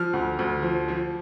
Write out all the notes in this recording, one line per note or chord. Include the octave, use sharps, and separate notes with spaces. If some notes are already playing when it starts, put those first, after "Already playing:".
Already playing: F3 F6
D2
D2
F3
F3